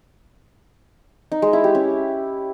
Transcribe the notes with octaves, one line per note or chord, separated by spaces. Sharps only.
D#4
G#3
E4
G4
C#4